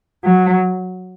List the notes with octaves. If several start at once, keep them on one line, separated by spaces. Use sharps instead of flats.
F#3